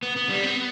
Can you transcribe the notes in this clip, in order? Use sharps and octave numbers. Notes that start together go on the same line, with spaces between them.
B3
B3
G3
B3